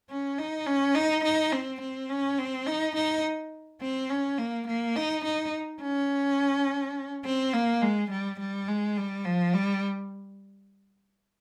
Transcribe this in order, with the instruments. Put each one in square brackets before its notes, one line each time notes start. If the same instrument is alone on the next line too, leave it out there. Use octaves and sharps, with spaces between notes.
[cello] C#4
D#4
C#4
D#4
D#4
C4
C4
C#4
C4
D#4
D#4
C4
C#4
A#3
A#3
D#4
D#4
C#4
C4
A#3
G#3
G3
G3
G#3
G3
F3
G3